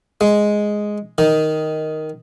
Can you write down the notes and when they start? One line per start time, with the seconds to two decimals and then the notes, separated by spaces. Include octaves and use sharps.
0.21 G#3
1.18 D#3